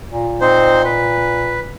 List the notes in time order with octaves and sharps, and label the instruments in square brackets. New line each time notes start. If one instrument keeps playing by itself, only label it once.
[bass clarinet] A#2
[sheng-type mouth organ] C4 D#4 C5
B4